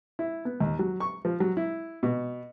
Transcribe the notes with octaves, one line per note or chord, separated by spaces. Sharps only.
E4
B3
D#2
F#3
C#6
F3
F#3
E4
B2